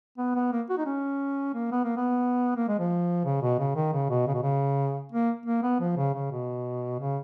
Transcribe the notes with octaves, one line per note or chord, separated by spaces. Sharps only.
B3
B3
A#3
F#4
D#4
C#4
A#3
B3
A#3
B3
A#3
G#3
F3
C#3
B2
C#3
D#3
C#3
B2
C#3
B2
C#3
A#3
A#3
B3
F3
C#3
C#3
B2
C#3